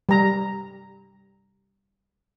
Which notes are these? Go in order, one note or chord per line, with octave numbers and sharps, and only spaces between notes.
G3 A#5